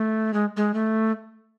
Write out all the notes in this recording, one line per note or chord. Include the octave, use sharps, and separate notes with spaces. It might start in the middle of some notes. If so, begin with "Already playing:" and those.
Already playing: A3
G#3
G#3
A3